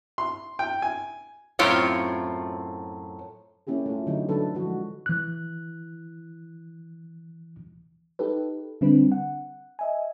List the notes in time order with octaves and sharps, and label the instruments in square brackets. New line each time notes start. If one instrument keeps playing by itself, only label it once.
[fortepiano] C6
G5
G#5
[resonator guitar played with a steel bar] F#2 A2 C4 F4 C#5
[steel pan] A#3 C#4 E4 G4 G#4
A3 F4
D3 F#3 D#4 E4 G4
D3 F#3 D4 E4 A4 B4
E3 F3 G#3 F#4
[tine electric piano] E3 F#6
[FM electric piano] D#4 G4 A4 B4
D3 G3 C4 D4 B4
F#5
D#5 E5 G#5